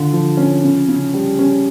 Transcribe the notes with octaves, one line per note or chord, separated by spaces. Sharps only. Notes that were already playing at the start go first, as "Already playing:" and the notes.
Already playing: D3 F4
F3
C#4
C#3
C#3
G3
C#4